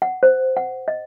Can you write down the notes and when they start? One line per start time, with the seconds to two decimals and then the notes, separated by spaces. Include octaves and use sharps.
0.02 F#5
0.23 C5
0.57 F#5
0.88 D#5